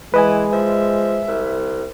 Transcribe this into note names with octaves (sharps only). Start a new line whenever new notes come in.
E3 G#3 B4 D#5 G#5
F3 E5
C2